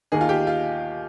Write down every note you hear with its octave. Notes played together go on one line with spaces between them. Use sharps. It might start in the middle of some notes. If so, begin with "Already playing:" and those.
D#2 D#3 A#3 D#4 G#4
F4
G4
F4